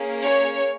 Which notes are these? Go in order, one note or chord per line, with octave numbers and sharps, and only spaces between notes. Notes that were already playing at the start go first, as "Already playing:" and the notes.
Already playing: A#3 C#4 G#4
C#5